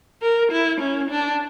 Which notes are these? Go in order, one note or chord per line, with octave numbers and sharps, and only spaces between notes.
A#4
E4
C#4
D4